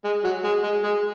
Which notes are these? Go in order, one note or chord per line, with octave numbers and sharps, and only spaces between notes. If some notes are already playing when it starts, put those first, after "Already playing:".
G#3
F#3
G#3
G#3
G#3